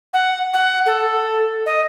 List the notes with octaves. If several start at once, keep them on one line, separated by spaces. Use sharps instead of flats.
F#5
F#5
A4
D#5